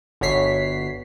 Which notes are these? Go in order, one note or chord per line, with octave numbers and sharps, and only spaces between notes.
G1 F#4 C#5 B6 C7